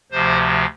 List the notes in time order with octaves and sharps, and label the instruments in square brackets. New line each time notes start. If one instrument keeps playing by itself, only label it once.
[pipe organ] D2 C3 F3 C5